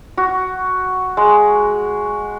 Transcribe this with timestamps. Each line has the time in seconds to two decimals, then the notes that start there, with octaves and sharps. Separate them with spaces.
0.17 F#4
1.17 G#3